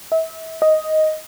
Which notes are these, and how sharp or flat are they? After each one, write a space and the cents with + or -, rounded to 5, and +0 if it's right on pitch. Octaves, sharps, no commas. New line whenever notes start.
E5 -35
D#5 +5